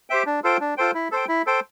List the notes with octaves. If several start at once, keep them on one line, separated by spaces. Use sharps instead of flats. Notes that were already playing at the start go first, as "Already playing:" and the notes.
G4 C5 E5 G5
D4
F4 A4 C5 G5
D4
F4 A4 C5 G5
E4
A4 C5 G5
E4
A4 C5 G5